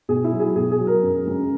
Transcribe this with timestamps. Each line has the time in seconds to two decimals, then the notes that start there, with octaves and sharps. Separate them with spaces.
0.08 B2 G#4
0.24 E4
0.32 F#3
0.40 G#4
0.55 B2 G#4
0.71 G#4
0.79 F#3
0.87 A#4
1.03 F#2
1.27 C#3 G#3